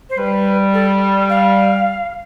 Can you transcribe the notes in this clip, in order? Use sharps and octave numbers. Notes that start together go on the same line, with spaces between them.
C5
G3 B4
A4
F5